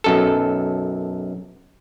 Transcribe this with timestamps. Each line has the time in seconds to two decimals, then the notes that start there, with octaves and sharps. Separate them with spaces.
0.04 B1 F#2 A4